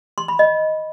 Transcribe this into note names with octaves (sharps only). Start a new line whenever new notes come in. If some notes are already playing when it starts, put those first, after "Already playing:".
C6
B5
D#5